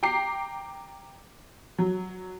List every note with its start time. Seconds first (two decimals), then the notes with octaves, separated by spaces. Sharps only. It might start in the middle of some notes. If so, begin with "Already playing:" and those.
0.03 G5 A#5 D6 C7
1.78 F#3